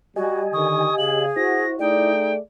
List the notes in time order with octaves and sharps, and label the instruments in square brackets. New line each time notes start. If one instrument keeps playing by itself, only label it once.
[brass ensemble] G3 [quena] F#4 [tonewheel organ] G4 D#5 G#5
[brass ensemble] D3 D#3 [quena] C#6 [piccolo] D#6
[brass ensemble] C#3 F5 [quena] G#4 [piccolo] F#7
[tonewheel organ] E4 [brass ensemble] F#4 C5 [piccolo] A#6
[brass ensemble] A3 G#4 D5 [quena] D#4 [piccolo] G5